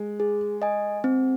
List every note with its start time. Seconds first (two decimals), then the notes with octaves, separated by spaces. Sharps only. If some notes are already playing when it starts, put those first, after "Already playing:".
Already playing: G#3
0.20 G#4
0.62 D#5 G#5
1.04 C4